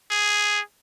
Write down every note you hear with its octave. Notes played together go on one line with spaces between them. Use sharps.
G#4